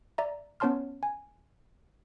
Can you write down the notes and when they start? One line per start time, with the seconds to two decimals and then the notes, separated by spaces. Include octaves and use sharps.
0.18 D5 E5 A#5
0.60 B3 C#4 C#5 A5 C6 F6
1.03 G#5